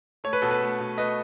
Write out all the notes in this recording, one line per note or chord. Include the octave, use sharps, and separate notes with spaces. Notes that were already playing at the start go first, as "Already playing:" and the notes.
A3 C#5
B4
B2 A4
B4
A3
B2
A3 B4 D#5